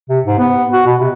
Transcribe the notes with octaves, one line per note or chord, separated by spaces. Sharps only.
C3
G#2
B3
F#4
B2
C3